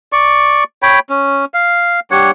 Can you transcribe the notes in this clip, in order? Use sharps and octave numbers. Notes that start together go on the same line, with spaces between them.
D5 C#6
C#5 G5 B5
C#4
F5
G3 D4 C#5 F#5